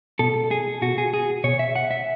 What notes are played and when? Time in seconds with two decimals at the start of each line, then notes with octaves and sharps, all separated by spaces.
0.19 B2 A4
0.51 G#4
0.81 B2 F#4
0.98 G#4
1.14 G#4
1.44 B2 C#5
1.59 E5
1.76 F#5
1.91 E5